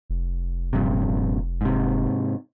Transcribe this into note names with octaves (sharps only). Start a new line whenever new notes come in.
F1
A#1 G2 C3
G#2 C3